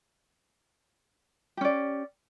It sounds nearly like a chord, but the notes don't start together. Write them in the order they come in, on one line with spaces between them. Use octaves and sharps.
G4 C#4 D5